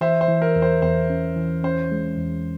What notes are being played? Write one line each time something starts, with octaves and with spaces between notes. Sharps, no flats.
E3 C5 E5
C5
E3
A#4
E2
C5
E2 C5
C#4
E3
C#4 C5
G#3
E2